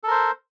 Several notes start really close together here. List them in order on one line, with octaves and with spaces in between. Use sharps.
A4 A#4 C5